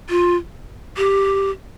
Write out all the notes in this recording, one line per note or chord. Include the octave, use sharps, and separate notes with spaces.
F4
G4